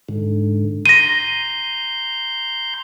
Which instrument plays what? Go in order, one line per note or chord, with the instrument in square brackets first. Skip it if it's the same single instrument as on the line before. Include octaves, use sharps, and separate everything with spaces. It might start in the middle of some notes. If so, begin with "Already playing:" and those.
[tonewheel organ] G#2 D3
[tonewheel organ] A#5 C6 G6 [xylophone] A#6 D#7